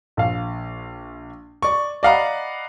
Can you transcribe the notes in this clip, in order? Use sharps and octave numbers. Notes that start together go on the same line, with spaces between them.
A#1 F5
D5 C#6
D5 D#5 F5 F#5 A#5 B5